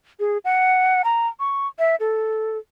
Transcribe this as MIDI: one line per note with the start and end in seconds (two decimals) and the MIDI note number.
0.20 0.38 68
0.45 1.02 78
1.04 1.28 82
1.40 1.68 85
1.79 1.95 76
2.00 2.58 69